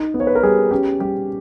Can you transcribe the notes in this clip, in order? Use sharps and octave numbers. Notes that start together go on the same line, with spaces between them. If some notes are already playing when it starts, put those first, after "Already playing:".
Already playing: D#4
B3
C#5
B4
A#4
G3 G#4
C#4 G4
G3 G4